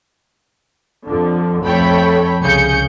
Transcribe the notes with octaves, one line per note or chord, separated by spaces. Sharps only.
F2 D3 F3
F2 A3 A4 C#5 G5 B5
C2 C#3 G#4 G6 C#7